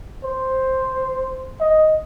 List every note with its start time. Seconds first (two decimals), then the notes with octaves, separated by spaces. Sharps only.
0.24 C5
1.60 D#5